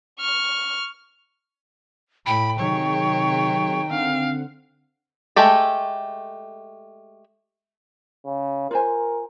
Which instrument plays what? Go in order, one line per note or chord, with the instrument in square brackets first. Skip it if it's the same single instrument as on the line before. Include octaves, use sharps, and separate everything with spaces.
[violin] C#6 F6
[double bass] A2 [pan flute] G5 [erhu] B5
[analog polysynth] C3 F#3 G#4 [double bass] D#3 [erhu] C#5
[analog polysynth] D3 C4 F#5 [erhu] F5
[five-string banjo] G#3 A3 G4 A4
[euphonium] C#3
[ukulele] F4 C5 G#5 [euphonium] A#4